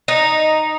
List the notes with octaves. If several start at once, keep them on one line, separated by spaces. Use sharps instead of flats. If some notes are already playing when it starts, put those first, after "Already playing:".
D#4